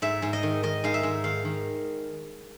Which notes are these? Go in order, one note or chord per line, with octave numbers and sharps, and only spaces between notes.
G#2 E5
G#2
D#5
D#3
D#3 D#5
G#2 F5
E5
G#2
D#3 F5
D#3